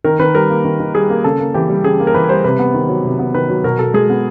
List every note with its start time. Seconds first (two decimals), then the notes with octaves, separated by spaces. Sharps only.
0.04 D#3 A#4
0.19 D#3 B4
0.35 G3 A#4
0.50 A#3
0.65 D#3
0.80 D#3
0.95 G3 G#4
1.10 A#3
1.24 C#3 A4
1.39 A#3
1.54 E3 G4
1.69 G3
1.84 C#3 G#4
2.00 A#3
2.07 A#4
2.14 E3 B4
2.29 G3 C5
2.44 C3 B4
2.59 B3
2.74 D#3
2.89 F#3
3.05 C3
3.19 B3
3.34 D#3 B4
3.49 F#3
3.64 B2 A#4
3.79 B2 A4
3.94 G#3 G#4
4.10 B3